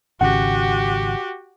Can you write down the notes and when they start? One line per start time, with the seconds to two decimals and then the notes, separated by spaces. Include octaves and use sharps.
0.21 G#1 C#3 F#4 G4 F#5